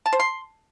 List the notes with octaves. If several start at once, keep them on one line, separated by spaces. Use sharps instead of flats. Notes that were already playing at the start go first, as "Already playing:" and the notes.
A5
C5
C6